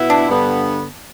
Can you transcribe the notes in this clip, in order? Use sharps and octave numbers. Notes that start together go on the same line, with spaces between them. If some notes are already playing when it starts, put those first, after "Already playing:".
Already playing: B2 B3 E4
D4
G2 D3 B3